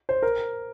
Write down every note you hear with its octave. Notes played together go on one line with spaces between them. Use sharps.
C5
A#4